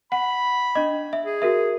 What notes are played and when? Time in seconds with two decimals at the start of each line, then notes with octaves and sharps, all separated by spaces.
0.12 F#5 B5
0.75 D4 D#5
1.13 E5
1.26 G#4
1.42 F#4 A#4 E5